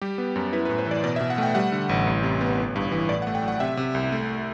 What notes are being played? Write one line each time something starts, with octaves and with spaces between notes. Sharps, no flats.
G3 G4
B3
F#2
E4 B4
B4
A2
C5
E3 D5
B2 D5
E5
B2
F#5
A3 G5
G3 F#5
D3
A1
C2
C3
B3
G1
G2
E3
A2 D5
F#5
A3
G5
F#3 F#5
C3 E5
C3
C2
A3